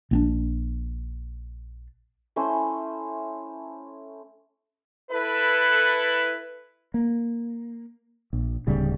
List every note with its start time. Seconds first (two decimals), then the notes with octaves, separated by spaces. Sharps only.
0.11 A#1 C4 D4
2.36 A3 C#4 E4 C5
5.11 E4 A4 B4
6.94 A#3
8.33 A#1
8.67 D1 D2 C#3 G3